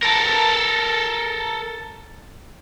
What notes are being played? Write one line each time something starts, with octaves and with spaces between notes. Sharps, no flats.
A4 A#4